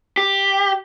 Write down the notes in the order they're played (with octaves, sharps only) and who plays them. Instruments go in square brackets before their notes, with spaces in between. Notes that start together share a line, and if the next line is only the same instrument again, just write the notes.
[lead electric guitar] G4